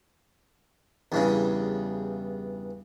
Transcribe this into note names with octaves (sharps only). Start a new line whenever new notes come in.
E2 G2 C#3